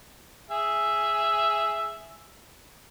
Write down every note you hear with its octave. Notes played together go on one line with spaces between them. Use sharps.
G#4 E5